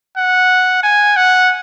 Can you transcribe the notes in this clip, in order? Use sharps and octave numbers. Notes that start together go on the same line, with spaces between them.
F#5
G#5
F#5